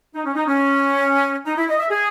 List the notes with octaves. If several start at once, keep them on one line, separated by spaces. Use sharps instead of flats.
D#4
C#4
D#4
C#4
D#4
E4
D#5
E5
G#4